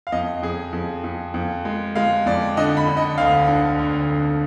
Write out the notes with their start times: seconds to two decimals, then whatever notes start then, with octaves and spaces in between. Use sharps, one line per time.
0.07 F5
0.12 F2 D#5
0.43 F2 G#4
0.73 F2
1.04 F2
1.34 F2
1.65 G#3
1.96 G#3 F5
2.26 F2 D5
2.57 D3 D#5
2.77 B5
2.87 D3
2.97 D#5
3.18 D2 F5
3.48 D3
3.79 D2
4.09 D3